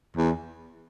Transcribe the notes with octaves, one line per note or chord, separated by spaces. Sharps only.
E2